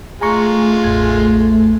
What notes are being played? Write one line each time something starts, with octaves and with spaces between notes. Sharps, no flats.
G#3 A3 F4 G#5 A#5 C#6
A1 E2 G#6